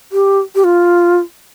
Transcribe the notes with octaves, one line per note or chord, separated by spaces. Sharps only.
G4
G4
F4